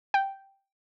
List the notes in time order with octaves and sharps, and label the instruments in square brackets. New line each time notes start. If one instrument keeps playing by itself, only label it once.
[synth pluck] G5